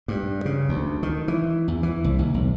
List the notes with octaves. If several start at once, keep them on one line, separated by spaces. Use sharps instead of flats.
G2
C#3
D2
D#3
E3
E2
E3
C2
D#2
B1